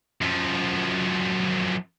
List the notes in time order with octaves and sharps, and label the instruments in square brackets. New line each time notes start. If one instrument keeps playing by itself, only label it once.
[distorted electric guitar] F#2 F3